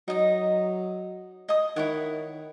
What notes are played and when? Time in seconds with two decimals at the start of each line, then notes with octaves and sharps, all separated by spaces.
0.08 F#3 D#4 D#5
1.49 D#5 D#6
1.76 D#3 E4 C#5 F#5